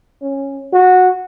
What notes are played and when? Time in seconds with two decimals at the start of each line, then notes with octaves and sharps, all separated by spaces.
0.22 C#4
0.73 F#4